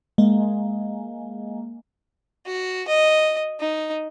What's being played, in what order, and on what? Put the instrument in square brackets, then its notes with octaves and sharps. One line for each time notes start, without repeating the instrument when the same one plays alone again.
[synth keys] G#3 A#3
[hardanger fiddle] F#4
D#5
D#4